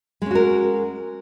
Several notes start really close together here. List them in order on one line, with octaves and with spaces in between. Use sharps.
G#3 C#4 F#4 A#4